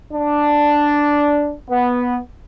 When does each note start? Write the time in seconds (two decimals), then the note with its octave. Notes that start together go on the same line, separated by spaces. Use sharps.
0.12 D4
1.68 B3